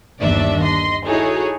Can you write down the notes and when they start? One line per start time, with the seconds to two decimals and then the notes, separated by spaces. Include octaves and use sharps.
0.19 G1 D#2 D4 D5 E5
0.61 D#5 C6
1.05 D#4 E4 F#4 G#4 A4 C#5